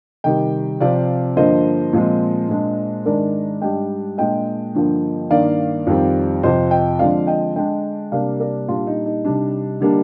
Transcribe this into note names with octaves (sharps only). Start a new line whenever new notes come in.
C3 D#3 G3 D#5 G5
C3 F3 C4 D5 F5
G2 D3 F3 A#3 C5 D#5
A#2 F3 G#3 C4
A#2 G#3 D4
G#2 D#3 G#3 D4 A#4 D5
G#2 G3 D4 D#5 G5
A#2 G#3 D4 D#5 G5
G2 D3 F3 A#3
G2 D#3 A#3 D5 F5
F2 D#3 G3 C4
F2 C3 F3 C5 D#5
D#5 G5
D3 F3 G#3 C4 D5 F5
D#5 G5
D3 G#3 D4 D#5 G5
C3 G3 A#3 D4 D5 F5
A#4 D5
A#2 G3 D4 F4
D#4
D#4
C3 G3 D4
D3 G3 A#3 D4